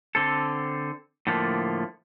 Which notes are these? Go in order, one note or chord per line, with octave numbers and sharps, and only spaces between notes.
D3 C4 A4
A2 D3 F3 A3 A#3